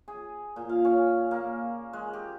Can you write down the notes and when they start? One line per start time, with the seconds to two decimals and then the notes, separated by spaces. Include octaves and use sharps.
0.08 G#4
0.56 A#2
0.69 F5
0.85 C#4
1.31 A#3
1.93 G#3
2.13 G4